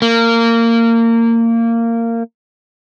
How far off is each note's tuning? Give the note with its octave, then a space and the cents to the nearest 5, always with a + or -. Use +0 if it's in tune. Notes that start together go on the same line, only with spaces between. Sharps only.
A#3 -20